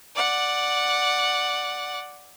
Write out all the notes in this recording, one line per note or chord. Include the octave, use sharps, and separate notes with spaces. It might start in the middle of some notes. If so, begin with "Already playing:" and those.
D5 F#5